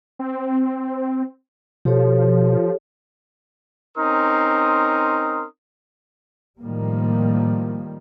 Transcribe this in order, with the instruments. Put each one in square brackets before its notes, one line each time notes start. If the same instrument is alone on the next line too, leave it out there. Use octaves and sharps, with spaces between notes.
[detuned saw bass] C4
[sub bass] B2 [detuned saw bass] F3 [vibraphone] G4 A4 C#5
[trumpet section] C4 C#4 D#4 A#4 C6 D#6
[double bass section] A2 D#3 F3 G3 A#3